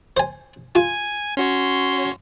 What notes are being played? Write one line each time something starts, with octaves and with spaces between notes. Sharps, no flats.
C5 G#5
F4 G#5
C#4 F#4 C#5 C6